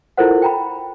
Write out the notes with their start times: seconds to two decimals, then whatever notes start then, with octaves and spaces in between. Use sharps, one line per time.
0.17 E4 F4 A4 A#4 C5 F#5
0.42 G5 A#5 B5